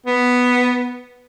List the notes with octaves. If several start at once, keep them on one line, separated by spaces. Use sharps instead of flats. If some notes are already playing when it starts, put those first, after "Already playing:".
B3